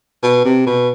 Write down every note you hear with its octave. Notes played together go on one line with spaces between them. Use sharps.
B2
C3
B2